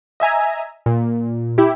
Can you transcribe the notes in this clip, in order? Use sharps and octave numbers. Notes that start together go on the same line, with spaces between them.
D#5 E5 G#5 A#5
A#2
E4 G4